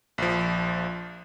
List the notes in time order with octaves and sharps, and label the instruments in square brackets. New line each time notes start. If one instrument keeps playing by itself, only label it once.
[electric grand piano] A#1 F3